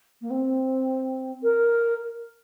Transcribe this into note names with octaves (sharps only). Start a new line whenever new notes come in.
A#3
C4
A#4